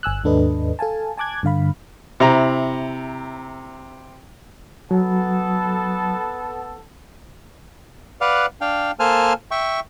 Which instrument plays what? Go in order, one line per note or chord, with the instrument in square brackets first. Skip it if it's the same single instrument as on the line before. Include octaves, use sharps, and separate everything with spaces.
[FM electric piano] G1 G#5 E6 F#6
D#2 G#2 D4 A4 B4 D#5
A4 F5 G#5 A5
G#5 A5 D6 F#6 G#6
G2 D3 F5 B5
[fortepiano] C3 E4 A#5
[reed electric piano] F#3 [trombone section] B3 A4
[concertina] B4 D5 F5 F#5
D4 F5 G5
A#3 A4 C5 G#5 A5 F6
E5 G5 C#6